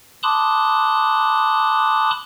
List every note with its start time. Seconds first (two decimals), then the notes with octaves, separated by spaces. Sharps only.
0.23 A5 B5 C6 D6 D#6 F#6